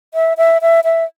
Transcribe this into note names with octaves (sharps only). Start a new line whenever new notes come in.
E5
E5
E5
E5